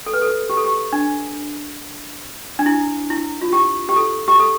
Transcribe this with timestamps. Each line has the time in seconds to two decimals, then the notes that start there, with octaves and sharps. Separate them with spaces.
0.06 A4
0.13 B4
0.22 A4
0.49 G4
0.57 A4
0.64 G4
0.93 D4
2.59 D4
2.66 E4
3.10 E4
3.41 F4
3.53 G4
3.89 G4
3.96 A4
4.28 G4
4.40 A4